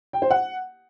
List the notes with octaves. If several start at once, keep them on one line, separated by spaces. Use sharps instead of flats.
G5
C5
F#5